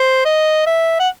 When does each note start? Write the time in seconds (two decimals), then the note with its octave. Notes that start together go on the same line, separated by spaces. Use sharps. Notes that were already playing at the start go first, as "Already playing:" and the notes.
Already playing: C5
0.25 D#5
0.67 E5
1.00 F#5